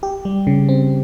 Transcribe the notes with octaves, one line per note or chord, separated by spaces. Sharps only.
G4
G3
C#3
C4